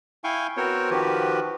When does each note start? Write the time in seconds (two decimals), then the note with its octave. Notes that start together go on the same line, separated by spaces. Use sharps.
0.24 E4 F5 G5 G#5 C#6
0.57 B3 C4 F#4 A#4 C5 C#5
0.90 D#3 F3 F#4 G4 B4